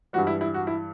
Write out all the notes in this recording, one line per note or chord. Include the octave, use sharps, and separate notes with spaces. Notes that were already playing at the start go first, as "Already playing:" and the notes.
G2 E3 G3 F#4
E4
E4
F#4
E4